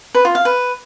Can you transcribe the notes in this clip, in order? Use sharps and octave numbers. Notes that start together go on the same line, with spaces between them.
B4
F4
F5
B4